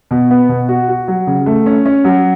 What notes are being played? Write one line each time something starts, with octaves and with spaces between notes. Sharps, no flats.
B2
B3
B2
F#4
F#4
F#3
C#3
A3
C#4
C#4
F#3